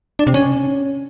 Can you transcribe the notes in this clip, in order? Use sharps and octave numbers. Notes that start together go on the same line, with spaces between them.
D4
C3
C#4